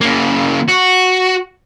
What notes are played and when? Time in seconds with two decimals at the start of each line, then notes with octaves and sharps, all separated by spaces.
0.01 C#3 A#3
0.68 F#4